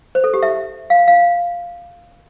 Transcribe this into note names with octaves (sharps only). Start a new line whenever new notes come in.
C5
A4
G4
E5
F5
F5